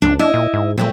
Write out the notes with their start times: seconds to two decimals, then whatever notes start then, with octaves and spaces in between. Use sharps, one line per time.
0.02 C#2 D4
0.19 D4 E4 D#5
0.34 A#2
0.53 G#2
0.78 A#2 G#3 A3 C4